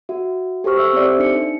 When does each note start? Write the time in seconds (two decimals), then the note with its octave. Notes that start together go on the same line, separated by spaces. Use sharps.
0.09 F#4 E5
0.64 G4 A4 C5 C#6 F6
0.77 E5 E6
0.93 C4 G4 A4 C5 D5 E5
1.18 D4 D#4 C#7